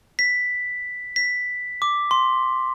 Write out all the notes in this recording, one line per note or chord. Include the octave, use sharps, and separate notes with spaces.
B6
B6
D6
C6